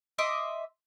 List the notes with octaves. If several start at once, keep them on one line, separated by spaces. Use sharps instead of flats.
D#5 E5 C6 D6